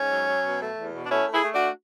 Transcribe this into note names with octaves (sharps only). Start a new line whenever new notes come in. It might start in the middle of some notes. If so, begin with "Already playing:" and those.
Already playing: G#2 C#4
F#3
F#3
B2
A3
E2
B2
D4
A3 C#4 E4
A3
E4 G#4
A3
D4 F#4